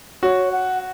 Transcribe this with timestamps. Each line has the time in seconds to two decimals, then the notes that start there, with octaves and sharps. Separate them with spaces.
0.23 F#4 C#5
0.52 F#5